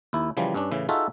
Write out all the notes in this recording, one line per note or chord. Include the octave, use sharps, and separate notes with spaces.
D#2 E4
C#3 E3 F3 G3
G2 C#4 D4
A2 C#3 E3
D#4 F4 F#4 G#4 A4 E5